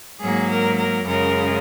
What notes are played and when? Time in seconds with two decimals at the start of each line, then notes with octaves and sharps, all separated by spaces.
0.21 G#2 F#3 A#3 G#4
0.50 A#4
0.78 A#4
1.06 F#2 C#3 G#3 A#4